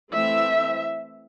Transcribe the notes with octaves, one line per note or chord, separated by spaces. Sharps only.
E3 A3 C4 E5